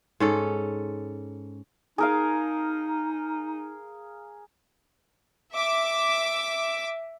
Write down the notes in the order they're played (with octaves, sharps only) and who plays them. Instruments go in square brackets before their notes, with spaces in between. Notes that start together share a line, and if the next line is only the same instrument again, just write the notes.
[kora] G#2 C#4 A4
[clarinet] D#4 [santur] G#4 A#4 F5
[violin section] E5 D6